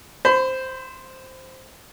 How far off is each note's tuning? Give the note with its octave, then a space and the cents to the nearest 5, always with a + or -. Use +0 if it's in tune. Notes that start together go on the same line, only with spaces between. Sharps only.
C5 +0 B5 +35